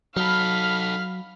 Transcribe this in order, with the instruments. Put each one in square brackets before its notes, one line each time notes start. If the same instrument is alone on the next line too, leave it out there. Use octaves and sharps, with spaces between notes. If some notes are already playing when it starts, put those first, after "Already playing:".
[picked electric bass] F#3 [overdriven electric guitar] D#4 A4 [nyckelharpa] F5 [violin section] B5 F6